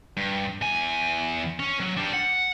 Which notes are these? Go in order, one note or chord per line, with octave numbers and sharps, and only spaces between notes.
G2
E2 G#5
C#4
F#3
G3 D4
F#5